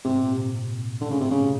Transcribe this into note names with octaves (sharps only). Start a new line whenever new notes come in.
G#2 C3
A#2
C3
A2 D3
G#2 C#3
A2 C3
C#3
A#2
C3